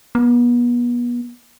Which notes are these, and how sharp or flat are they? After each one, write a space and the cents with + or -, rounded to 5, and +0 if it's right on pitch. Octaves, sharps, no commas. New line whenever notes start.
B3 -35